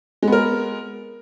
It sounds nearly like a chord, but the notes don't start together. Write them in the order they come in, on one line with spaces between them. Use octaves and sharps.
G#3 B3 A#4